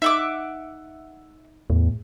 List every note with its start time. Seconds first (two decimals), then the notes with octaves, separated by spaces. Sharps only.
0.02 D#4 E5 F#5 D6
1.70 E2 A2